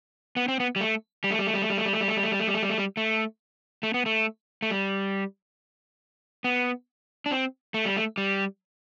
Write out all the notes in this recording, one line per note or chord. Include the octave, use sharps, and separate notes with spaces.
B3
C4
B3
G3
A3
G3
A3
G3
A3
G3
A3
G3
A3
G3
A3
G3
A3
G3
A3
G3
A3
G3
A3
G3
A3
G3
A3
A3
B3
A3
A3
G3
B3
D4
C4
A3
G3
A3
G3